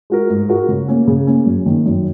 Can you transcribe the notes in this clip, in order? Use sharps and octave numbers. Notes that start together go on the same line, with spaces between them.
G#3 F#4 A#4
G#2
G#3 F#4 A#4
C#3
A#3 C#4
C#3
A#3 C#4
F#2
D#3 A#3
F#2